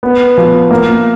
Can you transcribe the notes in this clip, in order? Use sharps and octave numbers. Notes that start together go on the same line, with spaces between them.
B3
F3
A#3